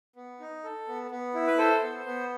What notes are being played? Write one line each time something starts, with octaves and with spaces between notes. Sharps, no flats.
B3
D#4
A4
B3
B3
E4
B4
A4 C5
B3
B3